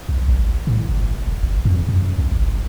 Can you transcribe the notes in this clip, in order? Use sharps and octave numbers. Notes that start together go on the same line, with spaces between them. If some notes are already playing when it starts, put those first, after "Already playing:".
B1
G#1
A2
G1
D#1
G1
F2
F#2
B1
G1